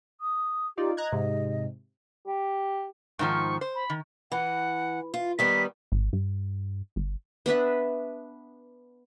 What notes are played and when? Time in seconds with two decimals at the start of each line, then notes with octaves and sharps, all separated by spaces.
0.21 D#6
0.78 D#4 F4 G4 D5
0.97 D#5 A#5 F#6 G#6
1.12 G#2 C3
2.27 G4
3.19 G#2 D#3 F3 C#6
3.61 C5
3.75 B5
3.90 D#3
4.32 E3 F#5
5.14 F4
5.39 D#3 G3 B3 B6
5.92 G#1
6.13 G2
6.96 G1
7.46 B3 D4 B4 E5